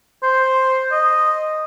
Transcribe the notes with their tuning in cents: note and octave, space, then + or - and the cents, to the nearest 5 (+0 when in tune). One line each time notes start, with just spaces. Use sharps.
C5 +0
D#5 -5